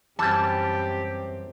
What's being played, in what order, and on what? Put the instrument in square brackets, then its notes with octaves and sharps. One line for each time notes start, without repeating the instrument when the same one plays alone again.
[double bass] F#2 C4 [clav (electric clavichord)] E3 G3 [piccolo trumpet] G4 [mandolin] A5